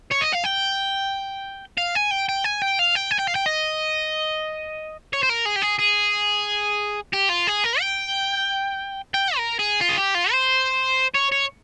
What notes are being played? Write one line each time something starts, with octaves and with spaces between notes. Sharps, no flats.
C#5
D#5
F5
G5
F5
G#5
G5
G5
G#5
G5
F5
G5
G#5
G5
F5
G5
D#5
C#5
C5
A#4
G#4
G4
G#4
G#4
G4
F4
G#4
A#4
G5
G5
A#4
G#4
F4
G#4
G4
F4
C5
C#5
C#5